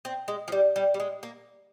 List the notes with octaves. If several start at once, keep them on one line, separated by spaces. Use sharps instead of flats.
C4
G#3
F3
G3
G3
G3
G#3
A#3